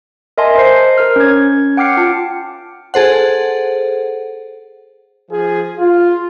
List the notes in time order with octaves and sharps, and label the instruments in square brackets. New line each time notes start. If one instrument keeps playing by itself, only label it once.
[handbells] A#4 D#5 E5 G#5 A5 C6
C5 C7
A#4 F6
C#4 C#5 G#6
F#5 G5 D6 F6 C7 C#7
F4 A5
[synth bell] G#4 A4 C5 F#5
[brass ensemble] F3 G#4
F4